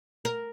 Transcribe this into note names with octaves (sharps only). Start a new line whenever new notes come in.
A#4